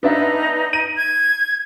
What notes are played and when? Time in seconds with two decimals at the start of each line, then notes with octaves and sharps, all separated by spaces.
0.03 B3 D4 D#4 E5
0.73 D#7
0.97 G#6